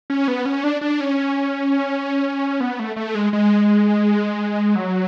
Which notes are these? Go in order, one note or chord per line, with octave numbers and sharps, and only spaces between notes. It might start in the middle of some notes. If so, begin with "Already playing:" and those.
C#4
B3
C#4
D4
D4
C#4
B3
A3
A3
G#3
G#3
F#3